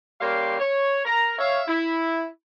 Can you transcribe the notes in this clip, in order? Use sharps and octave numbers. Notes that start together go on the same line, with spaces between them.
G3 A#3 C#4 F5 G5 C6
C#5
A#4 A#5
C#5 E5 F5
E4